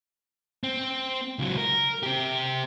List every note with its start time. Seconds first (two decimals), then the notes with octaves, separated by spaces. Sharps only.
0.63 C4
1.39 C#2 F#3
1.58 A#4
2.03 C4 G4